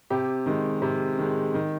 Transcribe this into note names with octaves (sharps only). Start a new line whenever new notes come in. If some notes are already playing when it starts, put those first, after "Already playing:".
C3 G4
D#3 G#3
C3
D#3 G#3
D#3